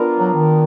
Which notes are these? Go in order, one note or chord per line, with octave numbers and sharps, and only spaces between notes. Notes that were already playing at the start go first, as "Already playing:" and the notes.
Already playing: B3 D4 F4 A#4
F#3
D#3